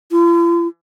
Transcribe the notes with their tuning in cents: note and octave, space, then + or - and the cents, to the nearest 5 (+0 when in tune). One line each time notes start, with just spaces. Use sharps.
F4 -45